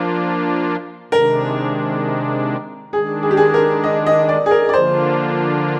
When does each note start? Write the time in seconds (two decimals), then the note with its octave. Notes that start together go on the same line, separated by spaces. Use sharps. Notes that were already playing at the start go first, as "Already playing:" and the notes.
Already playing: F3 A#3 D4 F4
1.12 C3 D#3 G#3 D4 A#4
2.93 D#3 G#3 D4 G#4
3.23 G#4
3.31 G4
3.37 G#4
3.54 A#4
3.84 D#5
4.06 D#5
4.29 D5
4.46 G#4
4.51 A#4
4.69 D5
4.73 D3 F3 A#3 D4 F4 C5